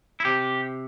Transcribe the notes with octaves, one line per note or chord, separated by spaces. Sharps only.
E4
C3 G4